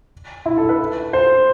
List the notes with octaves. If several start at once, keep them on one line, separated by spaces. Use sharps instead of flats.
E4
A4
B4
C5